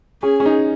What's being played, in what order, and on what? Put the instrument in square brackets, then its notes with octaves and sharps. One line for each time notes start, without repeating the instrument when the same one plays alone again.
[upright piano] C#4 [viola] G#4
[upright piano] C#4
D#4